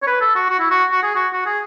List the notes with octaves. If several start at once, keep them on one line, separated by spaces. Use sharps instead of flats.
C#5
B4
A4
F#4
F#4
E4
F#4
F#4
G#4
F#4
F#4
G#4